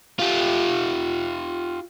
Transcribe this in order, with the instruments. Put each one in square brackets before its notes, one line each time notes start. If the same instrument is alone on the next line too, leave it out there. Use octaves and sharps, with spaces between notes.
[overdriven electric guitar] F4 G4